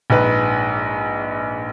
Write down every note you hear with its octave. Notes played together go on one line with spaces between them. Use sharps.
A#1 G#2 B4